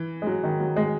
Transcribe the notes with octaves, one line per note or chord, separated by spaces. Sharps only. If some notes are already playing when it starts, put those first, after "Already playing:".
Already playing: E3
G#3
F#3
D#3
F#3
G#3